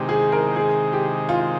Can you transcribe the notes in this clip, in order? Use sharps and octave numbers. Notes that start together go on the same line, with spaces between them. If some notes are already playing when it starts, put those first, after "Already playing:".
Already playing: C3 D#3 G#3 G4
G#4
A#4
G#4
G4
F4